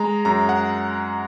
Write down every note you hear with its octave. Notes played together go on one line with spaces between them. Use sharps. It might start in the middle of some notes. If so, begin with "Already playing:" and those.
Already playing: G#3 A#5
F#2 A#5
F#5